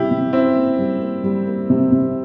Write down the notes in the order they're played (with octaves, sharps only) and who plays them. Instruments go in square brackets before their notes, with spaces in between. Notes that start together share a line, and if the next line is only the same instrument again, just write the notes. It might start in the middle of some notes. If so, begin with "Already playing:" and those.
Already playing: [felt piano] C3 G3 C#4 [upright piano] E4 G4
[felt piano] C3
[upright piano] C4 E4 [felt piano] C#4
[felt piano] A#3
G3
A#3
G3
A#3
C3
C3